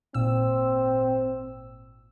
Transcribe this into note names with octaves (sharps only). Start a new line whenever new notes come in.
G#1 A#2 C4 E6